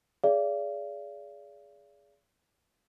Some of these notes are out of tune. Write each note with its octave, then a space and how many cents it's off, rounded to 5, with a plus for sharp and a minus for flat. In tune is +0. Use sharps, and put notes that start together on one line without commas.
G#4 +0 D5 -30 F5 -45